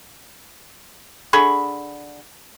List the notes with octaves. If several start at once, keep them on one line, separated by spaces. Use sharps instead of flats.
D3 G#4 B5 C#6